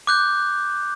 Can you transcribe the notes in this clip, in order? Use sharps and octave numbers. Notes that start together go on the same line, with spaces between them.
D6 F#6 G6